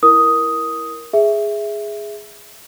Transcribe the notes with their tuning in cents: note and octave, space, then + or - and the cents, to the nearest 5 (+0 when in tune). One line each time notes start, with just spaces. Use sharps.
E4 +0 A#4 +10 D#6 +5
G#4 +0 E5 +0